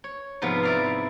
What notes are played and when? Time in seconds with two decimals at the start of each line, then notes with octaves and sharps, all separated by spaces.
0.04 C#5
0.42 G#2 C3 F3 B3
0.63 E4 D5 F5